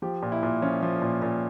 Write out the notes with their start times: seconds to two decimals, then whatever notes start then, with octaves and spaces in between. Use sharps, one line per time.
0.02 F3 G4
0.22 A#2
0.32 E4
0.43 A#2
0.62 F3 C#4
0.82 F3
1.02 A#2
1.22 A#2